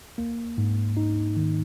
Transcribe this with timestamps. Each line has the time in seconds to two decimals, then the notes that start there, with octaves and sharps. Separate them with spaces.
0.18 A#3
0.58 G#2
0.97 D#4
1.37 D#3